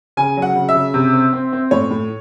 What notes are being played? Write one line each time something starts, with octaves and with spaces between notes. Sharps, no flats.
C#3 G#5
F#3
F#5
C#3
E5
C#3
C3
C4
C4
C4
A2 C#5
A2